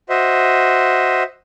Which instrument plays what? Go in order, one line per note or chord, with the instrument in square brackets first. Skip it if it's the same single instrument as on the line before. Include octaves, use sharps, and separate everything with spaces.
[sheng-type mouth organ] F#4 C5 D#5 E5